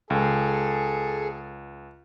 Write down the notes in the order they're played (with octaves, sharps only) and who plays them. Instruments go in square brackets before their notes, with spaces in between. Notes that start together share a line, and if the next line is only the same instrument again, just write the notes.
[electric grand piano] C#2 [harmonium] G#4 A4